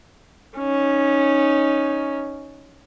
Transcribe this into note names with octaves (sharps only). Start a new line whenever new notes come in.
C#4 D#4